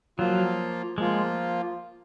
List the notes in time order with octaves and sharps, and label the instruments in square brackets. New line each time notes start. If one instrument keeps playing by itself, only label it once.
[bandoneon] F3 A#3 F4 [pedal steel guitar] F#3
[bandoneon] F3 A#3 F4 [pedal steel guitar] G#3